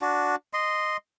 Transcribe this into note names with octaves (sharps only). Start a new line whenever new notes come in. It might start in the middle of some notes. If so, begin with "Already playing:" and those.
D4 F#4
D#5 C6